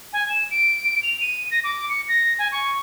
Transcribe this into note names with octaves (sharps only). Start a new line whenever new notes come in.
G#5
E7
D7
F7
D#7
A#6
D6
C#7
A#6
G#5
C#6